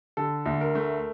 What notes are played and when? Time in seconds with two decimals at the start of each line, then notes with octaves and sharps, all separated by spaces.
0.17 D3 A4
0.46 D2
0.61 A#4
0.75 A3